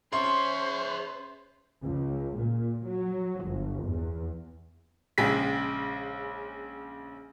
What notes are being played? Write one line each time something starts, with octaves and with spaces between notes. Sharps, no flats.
C#4 G#4 C5 C#5 E5 C6
C#2
A#2
F#3
G1
E2
A#1 C#3 G#3 G5 B6